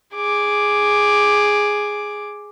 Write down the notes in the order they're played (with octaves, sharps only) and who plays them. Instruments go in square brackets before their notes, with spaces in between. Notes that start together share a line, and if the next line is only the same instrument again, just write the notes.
[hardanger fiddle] G#4 D6